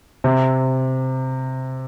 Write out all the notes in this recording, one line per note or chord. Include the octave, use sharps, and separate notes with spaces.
C3